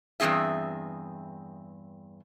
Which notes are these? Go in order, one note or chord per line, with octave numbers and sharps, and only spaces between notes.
E2 G2 F#3 C4 G#4 E5